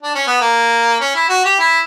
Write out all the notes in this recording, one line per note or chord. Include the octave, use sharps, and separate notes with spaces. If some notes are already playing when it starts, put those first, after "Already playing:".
D4
C#4
B3
A#3
C#4
E4
F#4
G4
E4